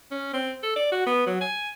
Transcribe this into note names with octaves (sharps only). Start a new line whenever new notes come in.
C#4
C4
A4
D5
F#4
B3
F#3
G#5